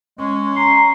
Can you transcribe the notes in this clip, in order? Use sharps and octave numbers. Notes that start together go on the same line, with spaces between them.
G#3 C#4
A#5 C6